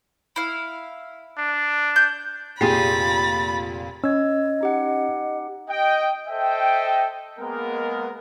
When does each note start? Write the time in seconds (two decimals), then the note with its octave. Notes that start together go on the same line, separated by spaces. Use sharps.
0.36 E4 F5
1.37 D4
1.96 G6
2.61 F1 A#2 G4 G#4 B5 A6 C7
4.04 C#4 D#5 E6 G#6
4.61 D#4 G4 F#5
5.69 D#5 G5
6.28 A4 C5 D#5 E5 G5
7.39 G#3 A#3 B3 A#4